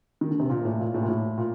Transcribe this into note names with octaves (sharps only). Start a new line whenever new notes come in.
D#3
D3
C3
A#2
A2
A#2
A2
A#2
A2
A#2